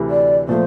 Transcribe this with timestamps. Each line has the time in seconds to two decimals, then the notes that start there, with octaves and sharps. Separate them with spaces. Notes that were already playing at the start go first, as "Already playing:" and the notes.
Already playing: D2 C3 E3
0.10 D5
0.48 A#2 F3 A3 C5